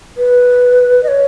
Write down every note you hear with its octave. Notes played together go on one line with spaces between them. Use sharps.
B4
D#5
C#5